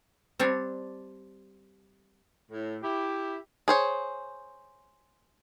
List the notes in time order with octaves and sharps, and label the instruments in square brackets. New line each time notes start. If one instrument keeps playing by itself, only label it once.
[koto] G3 C4 D4 C#5
[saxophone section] A2
E4 G4
[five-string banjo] G#4 C5 C#5